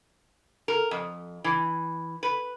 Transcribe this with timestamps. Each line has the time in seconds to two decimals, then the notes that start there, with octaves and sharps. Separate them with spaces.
0.68 A#4
0.91 F2
1.44 E3
2.23 B4